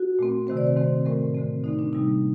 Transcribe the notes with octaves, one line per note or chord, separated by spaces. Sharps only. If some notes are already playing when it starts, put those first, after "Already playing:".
Already playing: F#4
A#2 A3 C4
C3 D#3 A3 C4 C5
D5
C5
D#3 A3 C4
A2 A3 C4 A#4
D3 A3 C4
D3 A3 C4 D#4
D4
C3 G3 A#3 D#4